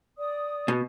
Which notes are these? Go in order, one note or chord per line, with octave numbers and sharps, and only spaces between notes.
D5 D#6
B2